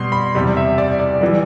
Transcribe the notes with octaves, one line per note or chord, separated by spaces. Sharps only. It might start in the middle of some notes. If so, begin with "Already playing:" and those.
Already playing: B2 G3 C6
B5
E2 C3 G3
E5
D5
D5
E3 G3